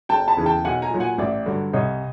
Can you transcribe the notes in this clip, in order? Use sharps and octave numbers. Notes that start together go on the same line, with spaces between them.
F#1 G5 A5
A5 B5
E2 C#3 E3
G5 A5
B1 F#5 G#5
G#5 A#5
A#2 F#3
F#5 G#5
A1 D5 E5
G2 D3 F#3
C2 C#5 D#5